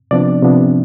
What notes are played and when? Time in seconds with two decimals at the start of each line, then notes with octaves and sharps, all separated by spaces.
0.11 C3 F3 B3 D4 D5
0.43 C3 F3 B3 D4